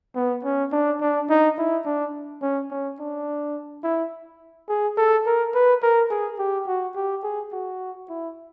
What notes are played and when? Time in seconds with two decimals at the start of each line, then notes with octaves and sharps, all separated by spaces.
0.15 B3
0.44 C#4
0.72 D4
1.01 D4
1.30 D#4
1.58 E4
1.86 D4
2.42 C#4
2.71 C#4
3.00 D4
3.84 E4
4.69 G#4
4.97 A4
5.26 A#4
5.55 B4
5.82 A#4
6.10 G#4
6.39 G4
6.68 F#4
6.96 G4
7.23 G#4
7.52 F#4
8.09 E4